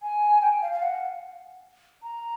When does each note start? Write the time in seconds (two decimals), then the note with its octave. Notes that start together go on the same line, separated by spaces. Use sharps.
0.03 G#5
0.42 G5
0.62 F5
0.72 F5
0.83 F#5
2.03 A#5